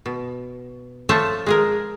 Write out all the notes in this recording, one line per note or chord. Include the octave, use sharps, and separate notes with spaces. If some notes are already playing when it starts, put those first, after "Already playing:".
B2
F3 A3 C5 C#5 A5
G#3 G#4 A#4